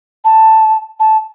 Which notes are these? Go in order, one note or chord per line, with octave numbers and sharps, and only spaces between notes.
A5
A5